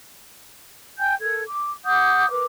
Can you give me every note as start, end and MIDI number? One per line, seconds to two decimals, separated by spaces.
0.98 1.14 79
0.98 1.14 80
0.98 1.14 91
1.20 1.40 69
1.20 1.40 70
1.20 1.40 92
1.48 1.70 86
1.85 2.27 78
1.85 2.27 86
1.85 2.27 87
1.85 2.27 91
2.29 2.43 70
2.29 2.43 71
2.29 2.43 86